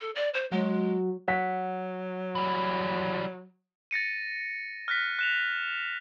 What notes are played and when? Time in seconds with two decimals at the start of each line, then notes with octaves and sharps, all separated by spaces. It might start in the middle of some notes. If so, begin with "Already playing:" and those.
0.01 A4
0.15 D5
0.34 C5
0.51 F#3 G#3
1.28 F#3 F#5 B6
2.35 E3 G3
3.91 A6 A#6 C#7 D#7
4.88 F6 F#6 A#6 B6
5.19 F#6 E7 F7